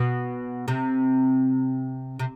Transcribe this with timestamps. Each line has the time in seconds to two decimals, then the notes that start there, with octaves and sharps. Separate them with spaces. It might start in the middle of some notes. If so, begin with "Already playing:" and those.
Already playing: B2
0.68 C3
2.19 C3